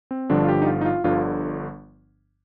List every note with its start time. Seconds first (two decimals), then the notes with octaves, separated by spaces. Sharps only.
0.11 C4
0.30 G1 G2 D3 F3 D4
0.44 F4
0.49 G4
0.62 D#4
0.67 F4
0.81 D#4
0.85 F4
1.04 G1 G2 D3 F3 F4